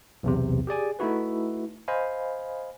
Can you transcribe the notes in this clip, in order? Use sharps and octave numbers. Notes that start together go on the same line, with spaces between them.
B1 E2 C3
G4 G#4 D5 G#5
A3 D#4 E4 F#4 B4
C5 D#5 F5 G#5 B5